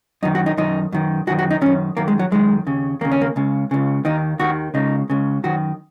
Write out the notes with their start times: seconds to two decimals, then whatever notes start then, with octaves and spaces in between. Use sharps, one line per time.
0.23 F#2 D#3 D#4
0.35 F#4
0.46 D#4
0.57 F#2 D#3 D#4
0.92 F#2 D#3
1.27 F#2 D#3 F#4
1.39 F#4
1.51 D#4
1.61 F#2 D#3 C#4
1.97 F#2 D#3 A#3
2.08 G#3
2.19 F#3
2.31 F#2 D#3 G#3
2.67 D#2 C#3
3.01 D#2 C#3 A#3
3.12 C#4
3.21 A#3
3.36 C#2 C#3
3.71 C#2 C#3
4.05 D#2 D#3 D#4
4.39 D#2 D#3 F#4
4.74 C#2 C#3 D#4
5.10 C#2 C#3
5.44 F#2 D#3 F#4